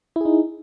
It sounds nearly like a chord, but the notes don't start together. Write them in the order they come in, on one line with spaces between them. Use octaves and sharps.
E4 G#4 D#4